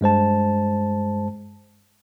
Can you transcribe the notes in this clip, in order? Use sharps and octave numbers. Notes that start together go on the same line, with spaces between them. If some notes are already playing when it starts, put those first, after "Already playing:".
G2 G#3 C5 A5